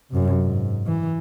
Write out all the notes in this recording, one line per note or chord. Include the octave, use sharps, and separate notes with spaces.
F#2 C3
G#2
E3